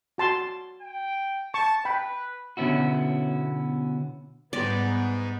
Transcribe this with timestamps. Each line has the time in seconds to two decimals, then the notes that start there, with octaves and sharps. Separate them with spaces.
0.18 F#4 A5 C6
0.81 G5
1.54 A5 C#6
1.85 B4 G5 B5
2.57 B2 D3 B3 C#4 E4 F#4
4.53 G#2 G3 G#3 B3 D#4 B4 D5